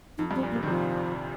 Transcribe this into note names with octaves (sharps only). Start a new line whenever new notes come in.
F2 D#4
G2 C4
A#2
A#3
C3
D#3
C3 F3